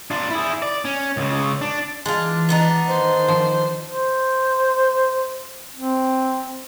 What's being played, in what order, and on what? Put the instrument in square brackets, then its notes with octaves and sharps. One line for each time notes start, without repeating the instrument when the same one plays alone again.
[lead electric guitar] D4 F4
E4 G#4
D5
C#4
C#2 C#3
D4
[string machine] E3 [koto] G#3 [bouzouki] D4 F4
[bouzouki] B3 D4 D#4
[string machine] D#3 [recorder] C5
[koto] F3
[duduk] C5
C4